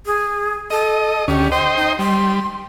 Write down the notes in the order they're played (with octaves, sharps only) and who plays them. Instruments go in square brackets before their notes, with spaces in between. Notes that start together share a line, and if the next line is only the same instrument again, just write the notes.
[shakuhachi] G#4
[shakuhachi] A4 [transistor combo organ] D#5
[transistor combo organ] D2 C#4 [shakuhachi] G4
[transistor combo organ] C5 D#5 G5 [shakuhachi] C6
[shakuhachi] D#4
[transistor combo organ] G3 [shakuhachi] C6